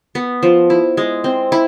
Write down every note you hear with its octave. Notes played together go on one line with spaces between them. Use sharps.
B3
F3
E4
G#3
C4
E4